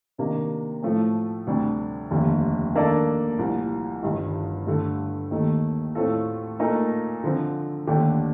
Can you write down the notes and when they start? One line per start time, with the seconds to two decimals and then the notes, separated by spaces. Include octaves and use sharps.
0.18 C3 D#3 A#3 D4
0.82 A2 F3 A3
1.47 D2 C3 G3 D4
2.11 F1 D#2 D3
2.75 D#3 A#3 D4 A4 D5
3.39 C2 A#2 F3
4.03 G1 G2 D#3
4.67 G2 D3 A3
5.31 D#2 D#3 A3
5.95 A2 A3 C4 F4 A4
6.59 A#2 A3 D#4 A#4
7.24 D3 F3 C4
7.87 D#2 D3 A3 D4 G4